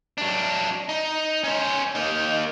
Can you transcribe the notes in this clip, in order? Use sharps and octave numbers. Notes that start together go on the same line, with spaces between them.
F#3 D4
D#4
C#4 C5
A#3 D#4